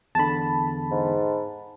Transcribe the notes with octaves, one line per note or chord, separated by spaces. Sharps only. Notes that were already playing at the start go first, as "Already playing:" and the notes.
E2 D3 A5 B5
G#2